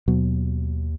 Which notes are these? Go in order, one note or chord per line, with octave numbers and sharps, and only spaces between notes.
D#2 B2 F#3